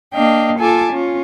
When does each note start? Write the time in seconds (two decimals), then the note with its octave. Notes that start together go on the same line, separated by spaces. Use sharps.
0.14 A#3 D4 D#5 F5 G5
0.58 F4 A4 G#5 A5 D6
0.92 C#4 F4